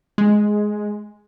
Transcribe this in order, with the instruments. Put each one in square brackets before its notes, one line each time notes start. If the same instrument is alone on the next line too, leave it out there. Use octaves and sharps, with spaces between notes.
[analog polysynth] G#3